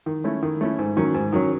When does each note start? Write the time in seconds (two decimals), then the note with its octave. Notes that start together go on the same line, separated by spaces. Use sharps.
0.06 D#3
0.24 A3 C#4 E4
0.42 D#3
0.61 A3 C#4 E4
0.79 G#2
0.97 D#3 F#3 C#4
1.14 G#2
1.33 D#3 F#3 C#4